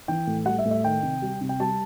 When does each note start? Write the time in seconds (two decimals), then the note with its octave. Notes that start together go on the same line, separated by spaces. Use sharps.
0.08 E3 G5
0.27 A2
0.46 G3 F#5
0.58 E5
0.65 A2
0.71 E5
0.84 D#3 G5
1.03 C3
1.22 G3
1.41 C3
1.49 G5
1.60 G3 A5